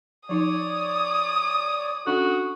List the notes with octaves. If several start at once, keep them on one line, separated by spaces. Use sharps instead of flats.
F3 D#4 C#5 D5 D6 D#6
C#4 D4 F#4 A4